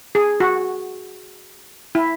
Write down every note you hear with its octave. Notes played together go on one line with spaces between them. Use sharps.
G#4
F#4
E4